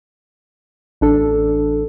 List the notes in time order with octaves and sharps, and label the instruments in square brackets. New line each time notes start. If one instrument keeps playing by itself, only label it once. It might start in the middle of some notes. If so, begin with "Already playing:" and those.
[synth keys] A1 D4 A4